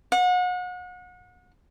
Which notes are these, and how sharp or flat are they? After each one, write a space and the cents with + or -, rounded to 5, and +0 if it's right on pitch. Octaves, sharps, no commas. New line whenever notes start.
F#5 -35